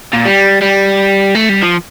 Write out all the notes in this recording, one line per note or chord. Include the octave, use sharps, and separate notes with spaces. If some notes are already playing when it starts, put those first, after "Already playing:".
A#2
G3
G3
A3
G3
F3